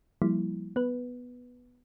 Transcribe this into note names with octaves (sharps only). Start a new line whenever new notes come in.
F3 G3 A#3 E4
B3 B4